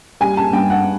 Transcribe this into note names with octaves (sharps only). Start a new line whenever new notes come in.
G3 G#5
A5
G2 G5
F#5